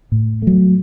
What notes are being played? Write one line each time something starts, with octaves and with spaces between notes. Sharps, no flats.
A2
F#3 A3